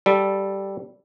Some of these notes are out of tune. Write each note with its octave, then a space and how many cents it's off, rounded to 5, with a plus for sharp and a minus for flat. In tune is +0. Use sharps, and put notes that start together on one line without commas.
G3 +0 A4 +0